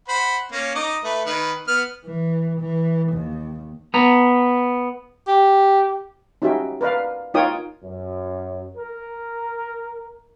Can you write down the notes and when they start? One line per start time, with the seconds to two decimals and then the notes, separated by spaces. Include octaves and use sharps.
0.08 C5 F#5 B5
0.52 A#3 C#4
0.75 D#4 D#5 D6
1.04 A3 B4
1.26 D#3 B4
1.68 B3 F6
2.06 E3
2.60 E3
3.13 D#2
3.94 B3 A#5
5.28 G4
6.42 C#4 D#4 F#4 G4 E5 G5
6.81 A#4 B4 D5 F5
7.34 D#4 F4 A#4 C#5 G5 D#6
7.83 F#2
8.77 A#4